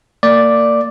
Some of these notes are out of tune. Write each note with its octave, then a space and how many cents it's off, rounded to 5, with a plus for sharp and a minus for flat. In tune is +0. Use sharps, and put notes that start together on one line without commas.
A#3 -35 D5 +0